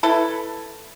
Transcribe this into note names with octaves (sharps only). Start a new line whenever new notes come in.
E4 A4 B4